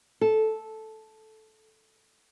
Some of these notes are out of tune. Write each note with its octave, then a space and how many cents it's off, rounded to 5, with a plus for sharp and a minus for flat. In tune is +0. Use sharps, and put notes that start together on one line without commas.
A4 -10